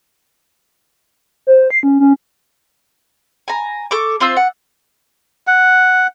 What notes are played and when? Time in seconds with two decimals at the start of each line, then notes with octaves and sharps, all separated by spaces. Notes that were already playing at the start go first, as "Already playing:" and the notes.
1.47 C5
1.70 C7
1.83 C#4
2.00 C#4
3.48 G#5 A#5
3.91 A4 C#6 D6
4.21 C4 F4 C5 E6
4.36 F#5
5.47 F#5